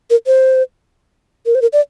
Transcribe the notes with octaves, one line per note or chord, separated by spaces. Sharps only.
A#4
C5
A#4
C5
A#4
D5